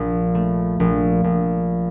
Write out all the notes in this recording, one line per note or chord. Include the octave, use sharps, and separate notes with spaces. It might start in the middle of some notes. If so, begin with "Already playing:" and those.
Already playing: A#1
A3
A#1
A#1